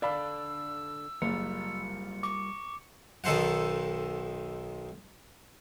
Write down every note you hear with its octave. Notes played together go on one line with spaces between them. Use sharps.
D3 D4 A4 D5 F5 B5 E6
F#1 G3 F4 A#4 C#7
C#6 D6
B1 D#3 A4 C5 F#5